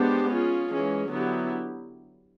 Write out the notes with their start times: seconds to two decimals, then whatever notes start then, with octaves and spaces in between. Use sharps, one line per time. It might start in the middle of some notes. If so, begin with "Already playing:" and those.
Already playing: G#3 B3 D4 G4 C5
0.30 C#4 F4 G#4
0.70 E3 G#3 C#4
1.10 D3 F#3 B3 E4 G4